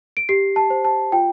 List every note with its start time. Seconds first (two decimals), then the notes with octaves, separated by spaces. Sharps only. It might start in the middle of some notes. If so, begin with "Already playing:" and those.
0.17 D7
0.29 G4 C7
0.56 A5
0.70 C5
0.84 A5
1.12 F4 G5